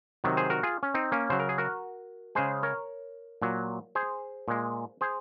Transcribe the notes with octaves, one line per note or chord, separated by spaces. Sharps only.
C3 D#3 F#3
G#4 C5
F#4 A#4
F4 G#4
C#4
C4 D#4
A#3 C#4
C#3 F#3 C5
A#4
G#4
F#4 A#4
C#3 G#3 G#4 C5
A#4 C#5
A#2 F#3
G#4 C5
A#2 G#3
G#4 C5